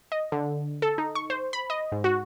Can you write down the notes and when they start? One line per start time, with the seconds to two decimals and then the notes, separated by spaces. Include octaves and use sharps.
0.12 D#5
0.32 D3
0.82 A4
0.98 D#4
1.15 C#6
1.30 C5
1.53 B5
1.70 D#5
1.92 G#2
2.04 F#4